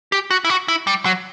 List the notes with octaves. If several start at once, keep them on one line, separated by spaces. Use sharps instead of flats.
G4
F#4
E4
F#4
E4
G3
F#3